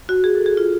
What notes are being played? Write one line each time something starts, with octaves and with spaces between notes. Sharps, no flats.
F#4
G#4
A4
G#4
F4